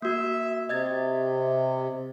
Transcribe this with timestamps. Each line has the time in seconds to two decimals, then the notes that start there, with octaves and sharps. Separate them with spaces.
0.02 A#3 F#4 E5
0.69 C3 D#5 G#6 A6